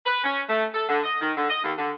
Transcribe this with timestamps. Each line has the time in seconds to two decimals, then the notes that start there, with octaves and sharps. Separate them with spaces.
0.05 B4
0.24 C#4
0.48 A3
0.74 A4
0.89 D3
1.03 D#5
1.20 D#3
1.37 D3
1.50 D#5
1.64 D#2
1.78 D3